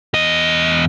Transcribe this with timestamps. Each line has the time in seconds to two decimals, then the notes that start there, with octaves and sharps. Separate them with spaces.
0.14 E2 D#5